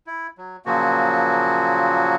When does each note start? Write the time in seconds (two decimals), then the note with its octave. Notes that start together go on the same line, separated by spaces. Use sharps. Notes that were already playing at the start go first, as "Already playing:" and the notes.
0.07 E4
0.38 F#3
0.66 A#2 C#3 F3 F#3 A#3 F#4